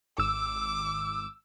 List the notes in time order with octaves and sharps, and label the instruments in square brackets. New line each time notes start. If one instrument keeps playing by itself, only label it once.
[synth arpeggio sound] G#1 E6 [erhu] D6